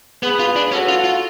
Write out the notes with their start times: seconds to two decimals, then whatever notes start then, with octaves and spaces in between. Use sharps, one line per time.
0.23 B3 G#4 B4
0.39 F4
0.56 D4
0.72 C#4 F#4 A4
0.88 F4
1.04 F4